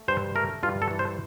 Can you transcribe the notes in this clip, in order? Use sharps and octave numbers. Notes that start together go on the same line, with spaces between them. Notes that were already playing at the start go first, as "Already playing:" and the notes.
Already playing: A3
G2 C5
A3 A#4
G2 F4
A4
E3
C5